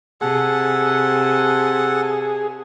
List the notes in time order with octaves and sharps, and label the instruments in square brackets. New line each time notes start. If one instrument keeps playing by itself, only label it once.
[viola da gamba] C3 [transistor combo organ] G#4 [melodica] A4 F#5